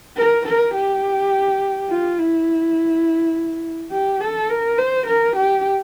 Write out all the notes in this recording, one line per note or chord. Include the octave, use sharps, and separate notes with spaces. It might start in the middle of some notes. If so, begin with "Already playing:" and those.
A#4
A#4
G4
F4
E4
G4
A4
A#4
C5
A#4
G4